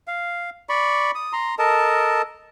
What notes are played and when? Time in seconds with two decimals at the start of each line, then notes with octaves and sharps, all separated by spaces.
0.08 F5
0.69 D5 B5 C#6
1.15 D#6
1.33 A#5 C6
1.59 A4 A#4 D#5 A5